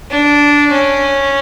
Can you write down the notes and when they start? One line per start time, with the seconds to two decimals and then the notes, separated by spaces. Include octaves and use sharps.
0.11 D4
0.72 C#4